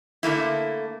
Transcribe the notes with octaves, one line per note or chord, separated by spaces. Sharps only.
D3 A3 A#3 E4